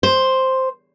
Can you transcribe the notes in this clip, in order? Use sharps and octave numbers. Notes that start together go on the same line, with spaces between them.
C5